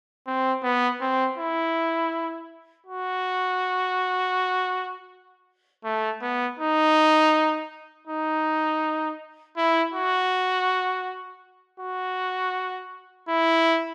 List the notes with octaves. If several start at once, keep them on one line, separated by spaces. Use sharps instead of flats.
C4
B3
C4
E4
F#4
A3
B3
D#4
D#4
E4
F#4
F#4
E4